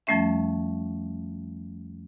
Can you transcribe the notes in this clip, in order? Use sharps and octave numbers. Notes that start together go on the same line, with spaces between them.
F2 F3 G3 A3 C#4 E5